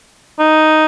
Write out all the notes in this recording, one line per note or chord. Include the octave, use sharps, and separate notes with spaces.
D#4